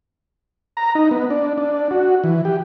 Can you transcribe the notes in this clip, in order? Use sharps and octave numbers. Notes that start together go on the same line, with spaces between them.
A#5
D#4
B3
D4
D4
F#4
E3
G4